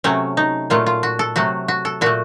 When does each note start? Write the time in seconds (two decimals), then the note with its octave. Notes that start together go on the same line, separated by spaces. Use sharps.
0.04 C3 F#3 A3 C#4
0.37 D#4
0.70 A#2 F#3 A3 F4
0.86 F4
1.03 F#4
1.19 A4
1.36 C3 F#3 A3 F#4
1.68 F#4
1.85 A4
2.01 A#2 A3 F#4